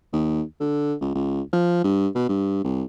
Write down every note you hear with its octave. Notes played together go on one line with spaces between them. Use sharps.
D#2
D3
C#2
C#2
F3
G2
B2
G2
C2